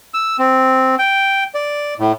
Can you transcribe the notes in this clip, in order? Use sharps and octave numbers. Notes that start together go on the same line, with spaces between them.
E6
C4
G5
D5
A2